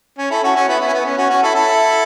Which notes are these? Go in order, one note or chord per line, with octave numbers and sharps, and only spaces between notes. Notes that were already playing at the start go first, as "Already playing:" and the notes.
C#4
E4 A4
C#4 F#4
C#4 F#4
B3 E4
B3 E4
C#4
B3
C#4
C#4 F#4
C#4 F#4
E4 A4
E4 A4